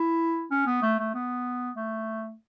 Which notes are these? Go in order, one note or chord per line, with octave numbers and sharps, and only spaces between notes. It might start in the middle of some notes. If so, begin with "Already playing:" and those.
Already playing: E4
C#4
B3
A3
A3
B3
A3